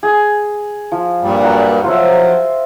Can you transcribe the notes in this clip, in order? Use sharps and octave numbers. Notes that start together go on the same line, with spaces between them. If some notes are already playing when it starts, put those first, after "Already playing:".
G#4
F3
G2 A#2 G3
F#3 F#5
F3 F#3 F4 C5 E5